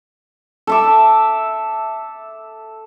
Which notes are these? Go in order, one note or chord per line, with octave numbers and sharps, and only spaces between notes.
A4 E5 D6